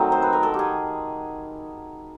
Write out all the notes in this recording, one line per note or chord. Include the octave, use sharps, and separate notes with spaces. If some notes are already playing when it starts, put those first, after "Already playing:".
Already playing: D#3 F#3 A3 C4
C5
B4
A#4
A4
G4
G#4